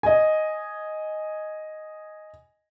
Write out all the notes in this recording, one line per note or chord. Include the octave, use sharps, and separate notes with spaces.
D#5 G#5